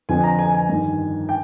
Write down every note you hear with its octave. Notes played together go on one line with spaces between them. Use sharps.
F2 D3 F3 G#5
A#5
G#5
G#5
G2 D#3
G5